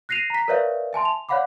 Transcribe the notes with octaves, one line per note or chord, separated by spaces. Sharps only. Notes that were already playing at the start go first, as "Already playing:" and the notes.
F#6 A#6 C7 D#7 F7
A#5 B6
A#4 B4 C#5 D5 E5 F5
E5 G#5 A5 C6
F7
C#5 D5 F5 F#5 B5 D6